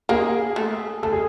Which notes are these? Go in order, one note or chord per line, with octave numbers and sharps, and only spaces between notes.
A#3 G#4
A3
A3 A4
G#4